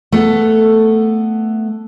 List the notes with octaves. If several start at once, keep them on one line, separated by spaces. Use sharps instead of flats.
A3 B3 A4